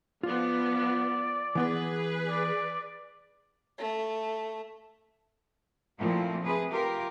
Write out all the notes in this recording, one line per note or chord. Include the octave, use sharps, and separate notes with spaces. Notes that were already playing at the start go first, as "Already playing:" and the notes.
F3 B3 F4 D5
E3 B3 G#4 B4 C6
D5
A3
A#2 F3 A3 A#3 C4 E4
C3 G#4 B4
F4 G4 A#4